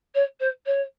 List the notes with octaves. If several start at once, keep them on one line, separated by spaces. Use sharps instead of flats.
C#5
C5
C#5